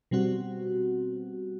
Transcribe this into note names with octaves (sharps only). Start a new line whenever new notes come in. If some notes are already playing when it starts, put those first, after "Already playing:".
B2 G3 C4 F#4